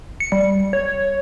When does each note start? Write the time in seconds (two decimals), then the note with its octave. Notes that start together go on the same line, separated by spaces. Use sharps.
0.20 C#7
0.32 G3
0.73 C#5